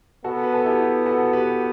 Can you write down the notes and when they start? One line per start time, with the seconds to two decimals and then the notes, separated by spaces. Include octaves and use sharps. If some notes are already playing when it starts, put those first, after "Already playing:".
0.24 B3 F#4 A4
0.43 B4
0.54 A4
0.65 E4 G4
1.06 F#4 A4
1.33 G4 B4